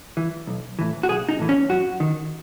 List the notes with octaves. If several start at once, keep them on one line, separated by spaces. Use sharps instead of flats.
E3
B1
A2 E3
F#4
B1 G#4
D#4
A2 E3
C#4
F#2 F#4
D#3